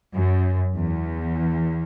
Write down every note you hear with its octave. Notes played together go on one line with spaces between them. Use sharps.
F#2
E2